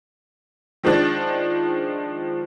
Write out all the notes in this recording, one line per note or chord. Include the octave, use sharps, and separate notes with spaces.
D#3 F3 G#3 D4 A6